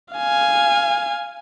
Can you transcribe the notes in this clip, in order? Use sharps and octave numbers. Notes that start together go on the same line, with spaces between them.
F5 G#5